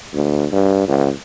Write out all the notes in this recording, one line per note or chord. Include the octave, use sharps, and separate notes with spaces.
D2
G2
C#2